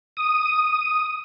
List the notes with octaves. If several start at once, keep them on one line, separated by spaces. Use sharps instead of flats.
D#6